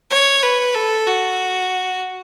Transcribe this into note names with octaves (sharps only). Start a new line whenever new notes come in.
C#5
B4
A4
F#4